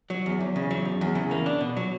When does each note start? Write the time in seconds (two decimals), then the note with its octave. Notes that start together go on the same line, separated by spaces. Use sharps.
0.10 F#3
0.26 E2
0.40 E2
0.56 C#3
0.71 F#3
0.85 E2
1.01 E2
1.15 C#3
1.31 A#3
1.46 D4
1.61 B2
1.77 F#3